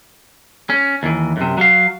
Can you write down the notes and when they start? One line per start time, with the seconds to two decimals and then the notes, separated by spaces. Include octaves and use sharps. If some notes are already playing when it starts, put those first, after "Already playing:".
0.70 C#4
1.03 D#2 E3
1.37 F#2 C3
1.58 F#3 F5